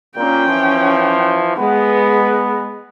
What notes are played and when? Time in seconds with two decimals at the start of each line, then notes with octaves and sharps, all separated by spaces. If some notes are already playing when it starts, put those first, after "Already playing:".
0.17 A#2 C#4 G5
0.47 E3 F3
1.57 G#3 B3